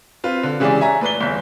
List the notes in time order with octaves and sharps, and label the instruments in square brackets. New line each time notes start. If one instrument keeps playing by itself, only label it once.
[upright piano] C4 F4 B4
D3
C#3 E3 G#3 G4 G#4 D5
C#5 E5 G#5 A#5
A2 B4 D5 G7
G1 E2